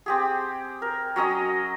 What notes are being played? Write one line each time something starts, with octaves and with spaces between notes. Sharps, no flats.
C4 G4 G#4
A#4
F#3 C#4 D#5 D#6